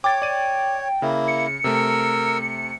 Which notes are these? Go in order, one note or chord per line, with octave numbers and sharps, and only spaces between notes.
C#5 G5 D6 A6
D5 D#7
C#3 A#3 E4
C#7
C3 A3 A#4 E6